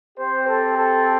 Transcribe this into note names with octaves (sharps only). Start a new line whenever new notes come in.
C4 G4 C5
A4
A4